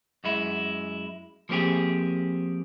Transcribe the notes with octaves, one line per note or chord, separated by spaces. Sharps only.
F#2 G#3 E4
F3 A#3 C4 G4 G#4